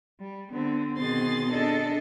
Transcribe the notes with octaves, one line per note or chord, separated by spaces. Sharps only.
G3
D3 B3 C4
B2 D#3 C4 G#4 C6 A6
D4 G#4 A4 D#5